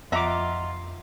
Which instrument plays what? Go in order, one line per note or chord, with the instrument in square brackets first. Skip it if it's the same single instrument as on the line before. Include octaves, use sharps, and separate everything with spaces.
[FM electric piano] F2 [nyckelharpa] F4 [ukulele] D#5 F#5 A#5 [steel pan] E5 D6